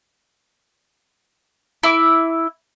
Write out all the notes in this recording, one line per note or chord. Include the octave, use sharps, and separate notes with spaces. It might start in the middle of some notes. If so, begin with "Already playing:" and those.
E4 D6